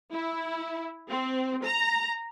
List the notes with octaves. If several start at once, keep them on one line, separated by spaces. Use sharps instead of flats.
E4
C4
A#5